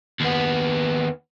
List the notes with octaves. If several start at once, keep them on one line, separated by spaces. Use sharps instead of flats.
D#2 B3